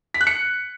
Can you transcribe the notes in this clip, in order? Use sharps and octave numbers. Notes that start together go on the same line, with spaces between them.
B6
F#6
C#7